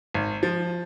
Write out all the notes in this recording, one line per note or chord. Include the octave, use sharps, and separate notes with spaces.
G#1
F3